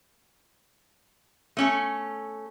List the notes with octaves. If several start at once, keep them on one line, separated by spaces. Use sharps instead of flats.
A3 C#4 A4